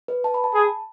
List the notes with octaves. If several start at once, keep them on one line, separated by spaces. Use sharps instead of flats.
B4
A5
B5
A5
G#4